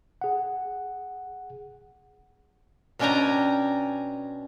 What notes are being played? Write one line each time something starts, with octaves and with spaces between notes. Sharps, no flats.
G#4 F#5
B2 C#4 D4 G5 G#5 A#5